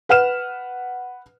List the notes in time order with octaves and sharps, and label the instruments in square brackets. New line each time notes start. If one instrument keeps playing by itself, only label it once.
[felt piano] B4 F#5 F6 E7